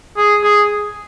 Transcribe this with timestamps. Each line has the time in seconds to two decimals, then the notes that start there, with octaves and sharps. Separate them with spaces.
0.18 G#4
0.44 G#4